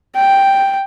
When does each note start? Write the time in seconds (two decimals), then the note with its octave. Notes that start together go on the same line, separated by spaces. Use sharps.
0.16 G5